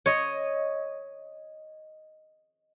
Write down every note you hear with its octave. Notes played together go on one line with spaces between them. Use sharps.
C#5 D#5